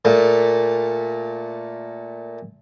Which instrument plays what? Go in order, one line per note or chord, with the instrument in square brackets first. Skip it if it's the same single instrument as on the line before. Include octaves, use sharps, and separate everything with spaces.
[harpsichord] A#2 A3